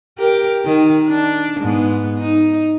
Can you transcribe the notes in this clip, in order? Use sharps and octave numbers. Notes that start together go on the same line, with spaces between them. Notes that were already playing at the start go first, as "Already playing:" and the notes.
G4 A#4
D#3
D4
G#2 B3
D#4